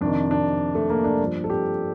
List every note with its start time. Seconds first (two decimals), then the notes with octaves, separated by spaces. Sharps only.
0.01 F2 C3 D#3 D4
0.31 D4
0.75 A3
0.90 A#3
1.04 D4
1.19 G2
1.25 F3
1.44 A4
1.50 G4